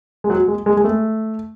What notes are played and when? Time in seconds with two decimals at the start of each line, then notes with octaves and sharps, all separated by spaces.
0.24 G#3
0.30 F#3
0.48 G#3
0.66 G#3
0.77 G#3
0.84 A3